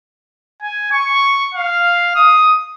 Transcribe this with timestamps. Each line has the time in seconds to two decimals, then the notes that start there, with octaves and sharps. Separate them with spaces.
0.62 G#5
0.91 C#6
1.54 F5
2.15 D#6